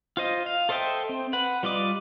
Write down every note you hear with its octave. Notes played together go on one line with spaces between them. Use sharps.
F4 C5 D#5
F5
A4 C5 D#5 E5 G5
C4
B4 F#5
G3 F4 D5 D#5 D6